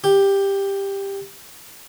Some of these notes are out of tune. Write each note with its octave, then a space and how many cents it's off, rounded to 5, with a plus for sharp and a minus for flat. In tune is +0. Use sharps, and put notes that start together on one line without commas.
G4 +10